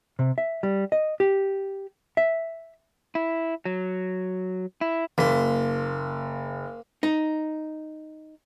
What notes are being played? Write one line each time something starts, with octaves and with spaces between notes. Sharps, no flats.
C3
E5
G3
D#5
G4
E5
E4
F#3
E4
F#1 A#3 C6 B6
D#4